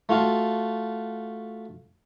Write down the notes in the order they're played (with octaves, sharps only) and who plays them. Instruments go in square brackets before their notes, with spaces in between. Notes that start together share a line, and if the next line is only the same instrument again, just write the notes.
[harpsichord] A3 F4 F#4 F5